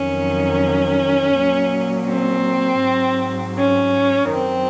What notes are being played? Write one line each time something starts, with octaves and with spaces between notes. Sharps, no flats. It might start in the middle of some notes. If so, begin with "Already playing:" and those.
Already playing: F2 D#3 F#3 C#4
A#2 F#3
C4
G#2 F#3
C#4
F#2 D#3 F#3 C4